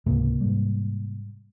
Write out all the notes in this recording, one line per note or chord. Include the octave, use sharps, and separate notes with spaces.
C#2 G#2 C3 A#3
G#2 G3